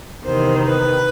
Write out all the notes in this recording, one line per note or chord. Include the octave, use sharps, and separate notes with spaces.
E2 C3 D#3 C5
B4